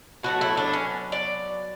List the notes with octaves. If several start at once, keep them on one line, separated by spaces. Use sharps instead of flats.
B2 F#3 A3 F#4
E4
D4
C#4
D5